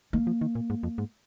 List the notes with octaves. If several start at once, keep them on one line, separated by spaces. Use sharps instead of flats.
D#3 A#3
F3
D#3
A#2
G#2
F2
G#2